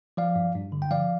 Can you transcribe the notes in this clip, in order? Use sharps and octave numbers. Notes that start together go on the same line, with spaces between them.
F3 D5 F5
G2
G2
D3
G5
F3 D5 F5